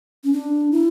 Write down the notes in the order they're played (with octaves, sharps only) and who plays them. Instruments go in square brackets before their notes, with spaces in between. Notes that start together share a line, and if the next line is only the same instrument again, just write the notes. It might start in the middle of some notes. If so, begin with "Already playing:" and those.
[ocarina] C#4
D4
E4